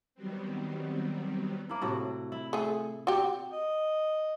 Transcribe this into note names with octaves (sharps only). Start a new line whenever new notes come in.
D#3 F#3 G3 B3 C4
A#3 E4
A2 C3 F#4
E4
A3 G#4
F#4 G4
D#5